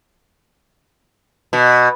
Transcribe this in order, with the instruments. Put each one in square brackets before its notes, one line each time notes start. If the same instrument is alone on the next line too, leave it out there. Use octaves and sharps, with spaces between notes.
[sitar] B2